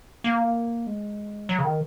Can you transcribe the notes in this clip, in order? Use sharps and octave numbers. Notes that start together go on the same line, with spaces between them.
A#3
G#3
F#3
C#3
D#3